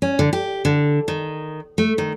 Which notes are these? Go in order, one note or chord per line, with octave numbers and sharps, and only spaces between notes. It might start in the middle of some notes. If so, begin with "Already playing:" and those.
C#4
D3
G4
D3
D#3
A3
D#3